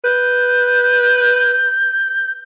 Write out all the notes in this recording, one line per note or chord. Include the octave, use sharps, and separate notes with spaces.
B4 G6